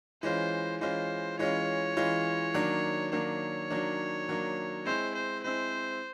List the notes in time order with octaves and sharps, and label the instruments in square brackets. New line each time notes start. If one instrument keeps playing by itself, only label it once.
[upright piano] E3 G#3 C#4 F4 [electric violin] C5
[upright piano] E3 G#3 C#4 F4 [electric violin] C5
[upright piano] E3 G#3 C#4 F4 [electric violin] C#5
[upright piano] E3 G#3 C#4 F4
D#3 F#3 A#3 D4
[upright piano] D#3 F#3 A#3 D4 [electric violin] C#5
[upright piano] D#3 F#3 A#3 D4
D#3 F#3 A#3 D4
[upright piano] G#3 C4 E4 [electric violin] C5
[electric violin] C5
[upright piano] G#3 C4 E4 [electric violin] C5